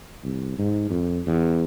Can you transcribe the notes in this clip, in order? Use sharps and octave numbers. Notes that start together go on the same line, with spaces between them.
C2
G#2
F2
E2